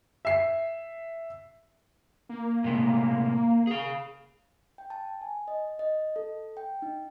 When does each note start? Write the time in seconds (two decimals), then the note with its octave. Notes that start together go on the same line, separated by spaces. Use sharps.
0.25 E5 C7
2.29 A#3
2.64 A2 C3 G#3
3.67 G#4 F5
4.78 G5
4.90 A5
5.21 G#5
5.48 D#5
5.79 D#5
6.16 A4
6.57 G5
6.82 D#4